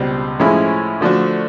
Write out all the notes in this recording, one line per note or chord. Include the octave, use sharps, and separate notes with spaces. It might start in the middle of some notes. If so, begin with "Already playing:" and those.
Already playing: C#2 B2 G3 C4
A2 F3 G#3 C#4 E4
D3 F3 A3 D4 F#4